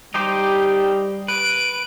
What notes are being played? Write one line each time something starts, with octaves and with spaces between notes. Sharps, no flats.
G3 D#4 G4 C5
B4 D7